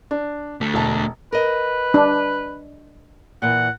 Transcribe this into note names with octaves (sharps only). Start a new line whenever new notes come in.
D4
D2 A3
E1 A5
A#4 B4 D#5
D4
A#2 E3 F#5